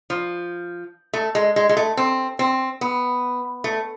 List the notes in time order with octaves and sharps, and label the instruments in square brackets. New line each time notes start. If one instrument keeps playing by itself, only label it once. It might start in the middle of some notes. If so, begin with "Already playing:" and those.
[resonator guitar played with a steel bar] F3
A3
G#3
G#3
G#3
A3
C4
C4
B3
A3